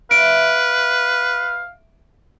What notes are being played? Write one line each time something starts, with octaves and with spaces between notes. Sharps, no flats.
B4 E5 F5 D7